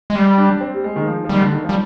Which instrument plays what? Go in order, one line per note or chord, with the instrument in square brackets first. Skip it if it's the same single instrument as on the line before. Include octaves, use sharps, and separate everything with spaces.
[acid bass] G#3
G3
[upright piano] D4
C4
G3
G#3
D#3
F3
F3
[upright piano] D#3 [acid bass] G3
[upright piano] D3
D#3
F3
[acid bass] G3